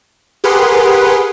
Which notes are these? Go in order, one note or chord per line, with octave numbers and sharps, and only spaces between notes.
G4 G#4 A#4 B4 F#5 C6